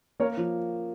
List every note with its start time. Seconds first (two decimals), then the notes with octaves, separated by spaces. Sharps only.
0.20 A#3 A#4 C#5
0.37 F3